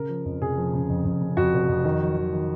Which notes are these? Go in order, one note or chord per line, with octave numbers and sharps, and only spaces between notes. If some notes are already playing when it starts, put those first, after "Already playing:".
Already playing: C#3 A#4
F3
F2
F1 G#4
F3
C#3
F2
F2
C#3
F2 F#4
F1
F2
D#3
F#3
D#3
D#3